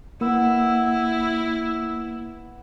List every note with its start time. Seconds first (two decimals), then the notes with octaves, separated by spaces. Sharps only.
0.21 A#3 B3 E4 E6